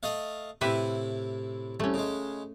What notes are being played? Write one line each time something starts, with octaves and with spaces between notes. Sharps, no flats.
A3 D#5 F5
A2 C3 E4 G4 B4 E5
C2 A3 C#4
C#3 G#3